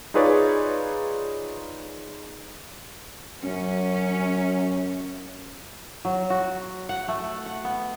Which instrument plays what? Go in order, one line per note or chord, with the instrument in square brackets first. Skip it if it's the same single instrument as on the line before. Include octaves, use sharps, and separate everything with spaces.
[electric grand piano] D#4 F4 G#4 B4 C#5 D5
[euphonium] F#2 [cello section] C#4
[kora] F#3
F#4
F#5
A3
F#5
B3